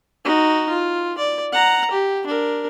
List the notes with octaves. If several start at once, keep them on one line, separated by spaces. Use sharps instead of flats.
D#4 F#4
F4
D5
F#5 A#5
G4
D4 A#4